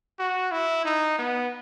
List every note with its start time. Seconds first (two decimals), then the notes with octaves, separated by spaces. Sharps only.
0.19 F#4
0.51 E4
0.85 D#4
1.18 B3